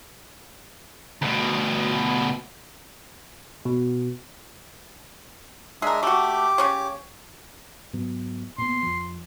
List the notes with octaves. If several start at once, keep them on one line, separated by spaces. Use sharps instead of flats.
D2 B2
B2
G#3 D4 G#4 A#4 E5
A3 F#4 G4 D6
C#3 C#4 C#5
G#2 F#3 B3
A#2 B3 C6
F2 F3